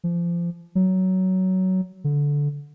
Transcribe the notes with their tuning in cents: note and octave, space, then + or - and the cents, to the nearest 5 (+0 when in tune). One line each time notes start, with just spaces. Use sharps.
F3 -25
F#3 +15
D3 -15